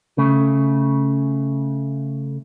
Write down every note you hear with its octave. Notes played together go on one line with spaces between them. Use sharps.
C#3 A3